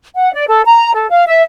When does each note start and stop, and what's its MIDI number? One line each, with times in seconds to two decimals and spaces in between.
0.15 0.32 78
0.33 0.47 74
0.47 0.61 69
0.66 0.92 82
0.94 1.07 69
1.10 1.25 77
1.27 1.42 76